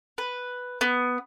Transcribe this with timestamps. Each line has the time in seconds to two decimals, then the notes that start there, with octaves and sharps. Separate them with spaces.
0.18 B4
0.81 B3